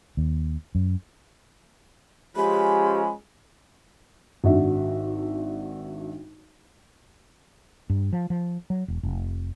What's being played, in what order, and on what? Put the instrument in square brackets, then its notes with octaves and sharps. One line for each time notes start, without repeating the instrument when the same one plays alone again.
[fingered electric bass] D#2
F#2
[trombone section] F3 G#3 C#4 [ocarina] G4 [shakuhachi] B5
[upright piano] G#1 D4 F#4 E5
[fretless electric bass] G2
F3
F3
F#3
E1
F1